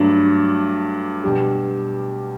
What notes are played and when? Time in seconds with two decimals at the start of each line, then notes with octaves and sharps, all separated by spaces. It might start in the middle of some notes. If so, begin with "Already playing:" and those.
Already playing: G2 F#3 A3 D4
1.23 B2 G3 D4 G4